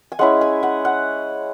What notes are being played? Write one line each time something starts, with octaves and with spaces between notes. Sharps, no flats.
G#5
G#3 C#4 E4 F#5
G#5
F#5
F#5